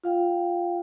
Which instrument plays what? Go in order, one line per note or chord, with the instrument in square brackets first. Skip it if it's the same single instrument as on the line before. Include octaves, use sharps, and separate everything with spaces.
[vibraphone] F4 F5 G5